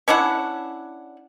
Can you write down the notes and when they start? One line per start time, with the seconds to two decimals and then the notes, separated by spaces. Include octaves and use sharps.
0.08 C#4 D4 E4 F#5